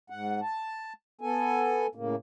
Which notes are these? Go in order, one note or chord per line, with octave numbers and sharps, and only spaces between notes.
G#2 F#5
A5
B3 A4 G#5
A2 C#3 A#3